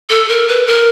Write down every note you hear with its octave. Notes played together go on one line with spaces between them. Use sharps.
A4
A#4
B4
A#4